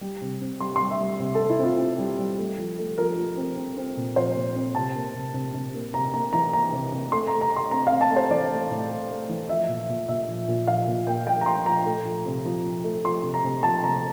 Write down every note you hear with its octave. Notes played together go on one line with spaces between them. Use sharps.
G3
C3
C4
G3 C6
C6
G3
E5
G3
C3
A4
C3
E4
C4 F4
C4
G3
G3
A3
F3
A3
F3 A#4
F3
C4
C4
C4
A#2
F3 C5
A#2
C4
C3 A5
A#3
C3
C3
C3
A#3
C3 A#5
A#3 A#5
E3 A#5
A#3 A#5
C3
C3
A3 C6
A#5
A3
A#5
A3
C6
C4 A#5
F5
C4
A5
A3
C5
E3 D5
A3
A2
A3
A3
E3
F3 E5
A#2
A#2
A#2 E5
F3
A#2
F3 F5
A#2
A#3 G5
F3 G5
A#5
F3 C6
F3 A#5
A3
F3
C3
F3
F3
A3
F3 C6
C3
A#5
C3
F3 A5
C3 A#5